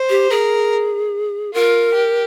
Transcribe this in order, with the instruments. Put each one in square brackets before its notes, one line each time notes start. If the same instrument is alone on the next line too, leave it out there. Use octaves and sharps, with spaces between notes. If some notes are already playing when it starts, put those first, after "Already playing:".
Already playing: [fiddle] C5
[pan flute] G4
[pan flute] G#4 [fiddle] A#4
[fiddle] F4 [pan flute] A#4
[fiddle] G4